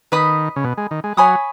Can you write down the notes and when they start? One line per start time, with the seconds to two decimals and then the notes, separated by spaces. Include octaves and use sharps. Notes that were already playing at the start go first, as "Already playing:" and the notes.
0.12 D#3 B4 D#5 B5 D#6
0.56 C#3
0.64 B2
0.78 G#3
0.91 D#3
1.04 G#3
1.17 F#3 C#5 G#5 B5 D#6